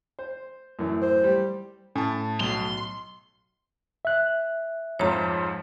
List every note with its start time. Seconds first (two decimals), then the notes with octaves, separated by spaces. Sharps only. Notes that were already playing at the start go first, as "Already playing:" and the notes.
0.19 C5
0.79 F#2 A2 E3
1.02 C5
1.24 G3
1.95 A2 C#4 A5
2.40 B1 C6
4.05 E5 F#6
4.99 F2 G#2 F3 C#5 A#5